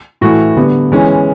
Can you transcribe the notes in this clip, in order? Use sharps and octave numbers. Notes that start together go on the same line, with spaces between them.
A2 E3 A3 F#4
D3 G3 B3
E3 G#3 C#4